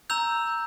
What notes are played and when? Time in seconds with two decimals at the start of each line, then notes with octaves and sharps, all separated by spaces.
0.10 A#5 E6 G6 F7